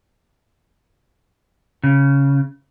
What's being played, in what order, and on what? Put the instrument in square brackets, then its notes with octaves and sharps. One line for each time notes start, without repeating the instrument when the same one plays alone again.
[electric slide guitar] C#3